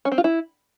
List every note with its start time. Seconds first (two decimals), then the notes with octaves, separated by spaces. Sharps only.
0.05 C#4
0.12 C4
0.18 F4
0.24 E4